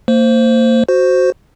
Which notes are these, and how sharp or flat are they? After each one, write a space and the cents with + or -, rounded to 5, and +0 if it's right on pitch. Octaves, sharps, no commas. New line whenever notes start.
A#3 -35 C5 +0
F#4 +0 C5 +0